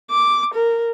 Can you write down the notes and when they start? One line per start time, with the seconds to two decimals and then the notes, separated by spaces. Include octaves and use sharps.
0.11 D6
0.54 A#4